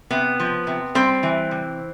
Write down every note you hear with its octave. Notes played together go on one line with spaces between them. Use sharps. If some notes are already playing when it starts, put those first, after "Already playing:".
C3 B3
F3
C3
G3 C4
E3
C3